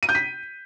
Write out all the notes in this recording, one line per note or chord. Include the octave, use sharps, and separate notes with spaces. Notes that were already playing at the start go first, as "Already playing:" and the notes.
D#7
G6
B6